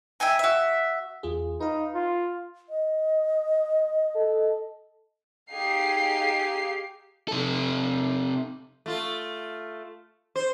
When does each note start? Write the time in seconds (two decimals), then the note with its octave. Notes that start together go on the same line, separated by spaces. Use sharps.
0.20 E5 G5 G#5 A#5
0.39 F#4 E5
1.23 E2 F4 G#4
1.60 D#4 B4 F5
1.95 F4
2.69 D#5
4.15 A4
5.52 D#4 G4 G#4 F5 C7
7.28 C3 A4
8.86 A3 F4
10.36 C5